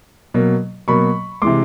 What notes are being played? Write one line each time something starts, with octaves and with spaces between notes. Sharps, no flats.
B2 F#3 A#3
B2 F#3 A#3 B5 C#6
C3 E3 G#3 C6 D6